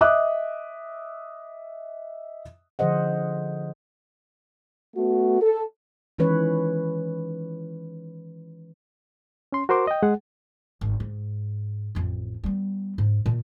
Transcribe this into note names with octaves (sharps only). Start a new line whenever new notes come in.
D#5 E5 D6 D#6 F#6
D3 F3 G#4 C5 D#5 F#5
A3 B3 F#4
A4
D#3 E3 G#3 C#4 B4 C#5
C#4 C6
F#4 A#4 C5 C6 D6
D#5 G5
G#3 G#4 F#5
G#1
G#2
A1 F2
G3 B3
G#2
A#2 D#3